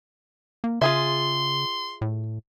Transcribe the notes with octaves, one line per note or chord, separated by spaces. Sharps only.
A#3
C#3 F4 G#4 E5 C6
A2